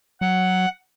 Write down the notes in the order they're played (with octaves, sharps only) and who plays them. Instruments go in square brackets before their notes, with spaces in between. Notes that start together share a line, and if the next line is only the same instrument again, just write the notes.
[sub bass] F#3 [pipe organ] F#5